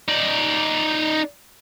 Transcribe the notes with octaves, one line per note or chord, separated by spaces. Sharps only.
D#4 D5